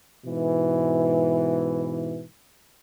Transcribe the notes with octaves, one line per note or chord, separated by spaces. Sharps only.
G#2 B2 E3